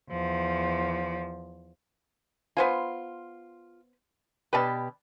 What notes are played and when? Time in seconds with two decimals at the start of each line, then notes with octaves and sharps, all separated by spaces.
0.11 E2 F3
2.57 B3 F4 C5 G#5
4.53 B2 G4 B4 D5 A5